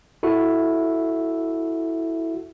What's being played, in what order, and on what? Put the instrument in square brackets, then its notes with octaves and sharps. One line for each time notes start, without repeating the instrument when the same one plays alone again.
[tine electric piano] E4 F#4 A4 E5